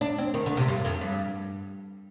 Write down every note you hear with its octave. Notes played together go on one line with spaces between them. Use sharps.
D4
C4
D#3
D3
C3
G2
F2
G2